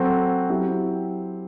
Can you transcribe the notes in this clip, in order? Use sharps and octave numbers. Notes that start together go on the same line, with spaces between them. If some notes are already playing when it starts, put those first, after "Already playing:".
Already playing: F#3 C4 F#4 A4
F#3 C4 E4 G4